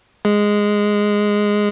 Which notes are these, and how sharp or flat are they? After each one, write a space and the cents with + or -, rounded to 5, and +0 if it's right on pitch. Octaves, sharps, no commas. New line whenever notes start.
G#3 -5